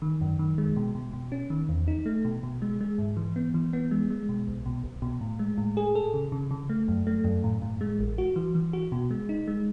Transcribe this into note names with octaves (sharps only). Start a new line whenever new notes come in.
D#3
F#2
D#3
G#3
B2
B2
B2
C#4
D#3
E2
D#4
A3
B2
B2
G#3
G#3
G#2
E3
B3
E3
B3
G#3
G#3
B2
B1
B2
B1
B2
A2
G#3
A2
G#4
A4
C#3
C#3
C#3
A3
F#2
A3
F#2
A2
A2
G#3
A1
F#4
E3
E3
F#4
B2
G#3
D#4
G#3